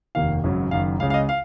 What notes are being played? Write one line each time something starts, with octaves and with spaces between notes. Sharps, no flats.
F1 D#2 D#3 A#3 F5
G#1 F#2 C#3 F#3
F#1 F#2 D#3 F5
C#2 C#3 G#3 F5
F5
D#5
F5